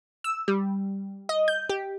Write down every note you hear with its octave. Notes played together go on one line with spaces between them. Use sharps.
E6
G3
D#5
G6
G4